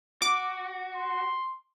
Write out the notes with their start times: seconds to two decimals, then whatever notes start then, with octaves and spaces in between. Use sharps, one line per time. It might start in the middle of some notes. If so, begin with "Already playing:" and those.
0.22 F#4 D6
0.95 C6